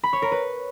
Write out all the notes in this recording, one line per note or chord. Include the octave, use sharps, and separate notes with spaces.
B5
C#5
A#4
B4